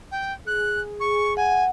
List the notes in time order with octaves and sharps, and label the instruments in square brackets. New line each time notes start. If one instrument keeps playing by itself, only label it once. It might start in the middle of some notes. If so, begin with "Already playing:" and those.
[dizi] G5
[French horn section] G#4 [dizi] F#6
[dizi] C#6
[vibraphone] F#5 [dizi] G#5